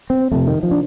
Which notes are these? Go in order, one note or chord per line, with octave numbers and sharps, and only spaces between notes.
C4
F2 C3 A3
D#3
F3
D4